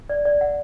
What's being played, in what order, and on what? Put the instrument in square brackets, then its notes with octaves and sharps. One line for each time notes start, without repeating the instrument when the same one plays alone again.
[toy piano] D5
D5
F#5